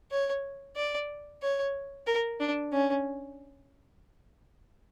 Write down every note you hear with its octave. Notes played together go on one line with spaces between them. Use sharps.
C#5
D5
C#5
A#4
D4
C#4